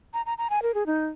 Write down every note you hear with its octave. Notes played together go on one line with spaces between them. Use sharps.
A#5
A#5
A#5
G#5
A#4
G#4
D#4